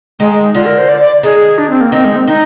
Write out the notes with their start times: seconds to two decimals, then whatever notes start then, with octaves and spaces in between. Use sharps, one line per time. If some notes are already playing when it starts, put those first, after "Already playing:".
0.20 D#3 G#3
0.54 D3 F4
0.66 A#4
0.78 C5
0.89 D5
1.01 D5
1.23 D#3 G#4
1.58 D4
1.70 C4
1.81 A#3
1.92 D#3 C4
2.05 G#3
2.16 C4
2.27 D#3 D#4